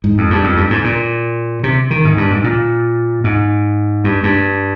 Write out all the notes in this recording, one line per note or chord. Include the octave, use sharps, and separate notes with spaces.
G#2
F2
G2
F2
G2
G#2
A#2
C3
D#3
G#2
G2
G#2
A#2
G#2
G2
G2